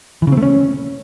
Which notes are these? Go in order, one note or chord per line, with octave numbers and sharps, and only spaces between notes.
E3
C#3
C4
A3
C#4